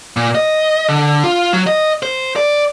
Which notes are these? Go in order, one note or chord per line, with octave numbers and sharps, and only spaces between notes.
A#2
D#5
D3
F4
F#3
D#5
C5
D5